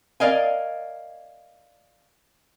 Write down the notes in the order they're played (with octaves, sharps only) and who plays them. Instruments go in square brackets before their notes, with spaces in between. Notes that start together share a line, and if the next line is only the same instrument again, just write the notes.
[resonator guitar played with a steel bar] A#4 D5 D#5 F5 G#5